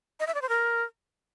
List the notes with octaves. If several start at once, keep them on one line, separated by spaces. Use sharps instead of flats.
D#5
E5
D5
C5
A#4